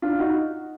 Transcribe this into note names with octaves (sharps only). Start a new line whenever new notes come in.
D4 F4
D#4 F#4